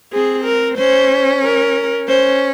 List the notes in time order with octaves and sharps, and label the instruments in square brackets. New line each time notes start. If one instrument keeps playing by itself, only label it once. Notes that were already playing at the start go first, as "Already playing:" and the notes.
[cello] C4 [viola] G#4
[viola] A#4
[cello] C#4 [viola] C5
[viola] A#4
[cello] C#4 [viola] C5